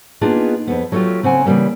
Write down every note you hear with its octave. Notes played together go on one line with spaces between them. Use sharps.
A#3 B3 D4 D#4 F4 G#4
F2 B3
F#3 A3 D4 F4 G4
C#3 C4 F#5 G#5
C#3 E3 G3 A3 A#3